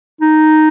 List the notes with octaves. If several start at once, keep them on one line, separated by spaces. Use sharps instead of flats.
D#4